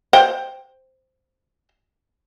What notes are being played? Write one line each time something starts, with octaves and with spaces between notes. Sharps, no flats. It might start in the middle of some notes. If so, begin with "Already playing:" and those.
C5 G5